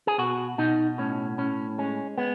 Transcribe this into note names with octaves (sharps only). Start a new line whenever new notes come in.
G#4
B2 F#4
B2 D#4
A2 C#4
A2 C#4
G#3 C#4
G#3 B3